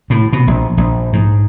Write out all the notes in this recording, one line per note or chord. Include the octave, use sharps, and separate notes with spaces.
A2
B2
A#1
A#1
G#2